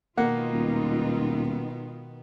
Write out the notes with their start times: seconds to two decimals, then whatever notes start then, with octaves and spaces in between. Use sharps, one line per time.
0.18 B2 D#3 G#3 A#3 B3 D#4 F4 F#5
0.53 D#1